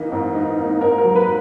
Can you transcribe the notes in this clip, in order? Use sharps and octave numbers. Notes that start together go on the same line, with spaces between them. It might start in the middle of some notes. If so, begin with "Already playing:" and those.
Already playing: E3 A#3 D#4
G#2
D#4
A#3
G#2 A#4
A#4
F#3
B4